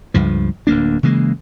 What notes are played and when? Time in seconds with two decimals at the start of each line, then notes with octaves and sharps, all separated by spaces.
0.14 C#2 G2 F3
0.67 D1 D2 A#3 D4
1.03 C#3 E3 G#3 A#3